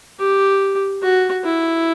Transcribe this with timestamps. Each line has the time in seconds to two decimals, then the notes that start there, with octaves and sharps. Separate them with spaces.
0.19 G4
1.02 F#4
1.45 E4